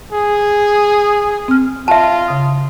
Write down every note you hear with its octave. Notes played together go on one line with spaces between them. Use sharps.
G#4
C4 F6
F4 E5 A5
C#3 D#6